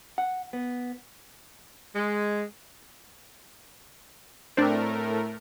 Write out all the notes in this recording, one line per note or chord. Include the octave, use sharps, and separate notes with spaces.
F#5
B3
G#3
A2 A3 C4 D4 A#4